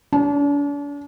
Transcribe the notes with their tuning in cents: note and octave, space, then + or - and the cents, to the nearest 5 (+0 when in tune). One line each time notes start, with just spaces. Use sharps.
D4 -40